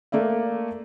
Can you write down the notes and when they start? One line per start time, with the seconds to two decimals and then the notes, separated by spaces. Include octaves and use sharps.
0.12 A3 A#3 D5 E5